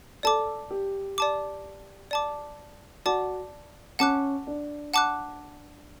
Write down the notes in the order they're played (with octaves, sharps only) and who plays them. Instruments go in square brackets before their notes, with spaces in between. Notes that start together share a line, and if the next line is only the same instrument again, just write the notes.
[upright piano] A4 [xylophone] D5 A5 D6
[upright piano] G4
[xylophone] D5 A5 D6
D5 A5 D6
[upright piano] F#4 [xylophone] D5 A5 D6
[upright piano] C#4 [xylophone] F#5 A5 D6 F#6
[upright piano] D4
[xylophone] F#5 A5 D6 F#6